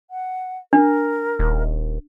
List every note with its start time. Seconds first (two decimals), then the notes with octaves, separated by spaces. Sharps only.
0.11 F#5
0.73 D4 A#4
1.39 D#1